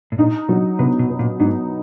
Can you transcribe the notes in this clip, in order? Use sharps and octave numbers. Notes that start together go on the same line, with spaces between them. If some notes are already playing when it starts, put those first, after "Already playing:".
A2
A#2 D#4
B2 F#3
C3 B3
B2
B2
A#2
G#2 D#4